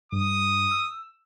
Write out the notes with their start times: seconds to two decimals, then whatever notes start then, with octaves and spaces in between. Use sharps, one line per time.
0.12 G2 D#6
0.71 E6